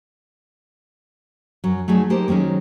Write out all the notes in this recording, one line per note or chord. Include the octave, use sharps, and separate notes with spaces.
F#2 F#3
F#3 A3 D#4 G#4 A4
A#3 D#4 G4 C5
D#3 F#3 G#3 C#4 D#4